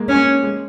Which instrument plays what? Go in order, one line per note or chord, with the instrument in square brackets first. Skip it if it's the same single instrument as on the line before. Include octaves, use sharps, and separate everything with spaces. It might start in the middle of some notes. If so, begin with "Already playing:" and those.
Already playing: [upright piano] G#3 A#3
[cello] C#4
[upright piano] G#3